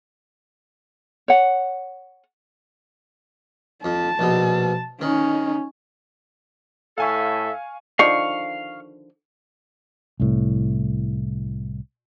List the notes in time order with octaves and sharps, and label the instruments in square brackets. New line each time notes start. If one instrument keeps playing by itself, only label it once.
[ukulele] C#5 F#5
[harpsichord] F2 [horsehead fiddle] A5
[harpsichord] A#1 B2
[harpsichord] D#3 [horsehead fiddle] C#4 D#4
[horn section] A2 A4 E5 [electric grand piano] F5 G#5 C#6
[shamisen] D3 D#3 F3 [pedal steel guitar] F5 C#6
[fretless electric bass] C2 A2